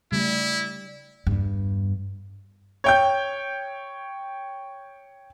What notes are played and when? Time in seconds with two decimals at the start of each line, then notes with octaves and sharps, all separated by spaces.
0.12 C#3 G3 A3 E4
1.27 E2 G2
2.84 C#5 G5 G6